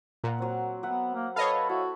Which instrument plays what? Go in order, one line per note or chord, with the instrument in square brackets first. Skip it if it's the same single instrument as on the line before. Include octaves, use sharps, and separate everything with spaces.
[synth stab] A#2 [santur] A#4 F#5
[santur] F#3 C4
[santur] F#3 E5 F#5 [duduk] B3
[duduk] A#3
[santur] A4 [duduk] B4 [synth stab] C#5 D#5 F5
[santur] E4 [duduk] F#4